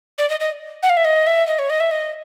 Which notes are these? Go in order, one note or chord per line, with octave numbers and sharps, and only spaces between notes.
D5
D#5
D#5
F#5
F5
E5
D#5
E5
D#5
C#5
D#5
E5
D#5